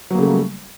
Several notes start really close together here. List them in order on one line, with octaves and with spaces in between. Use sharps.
F#3 A#3 C#3 A3 G3